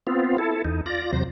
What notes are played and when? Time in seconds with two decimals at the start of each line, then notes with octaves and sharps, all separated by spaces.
0.07 B3 C4 F4
0.38 E4 A4
0.65 E2 D#4
0.86 F4 D5 A#6
1.13 E2 C3 F#3 C5 A#6